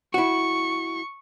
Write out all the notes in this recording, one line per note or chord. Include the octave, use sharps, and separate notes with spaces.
E4 F#4 C#6